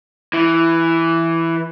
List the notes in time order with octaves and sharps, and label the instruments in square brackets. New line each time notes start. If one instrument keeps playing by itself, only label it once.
[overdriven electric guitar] E3